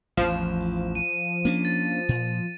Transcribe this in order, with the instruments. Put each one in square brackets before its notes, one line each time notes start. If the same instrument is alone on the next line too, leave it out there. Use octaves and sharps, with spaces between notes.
[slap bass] A1 E2 [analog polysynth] F3 [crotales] E7
[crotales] D#7
[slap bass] A#3 C#4 D4
[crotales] A6
[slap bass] A#2